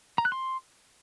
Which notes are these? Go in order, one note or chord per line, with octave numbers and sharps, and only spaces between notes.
A#5
F#6
C6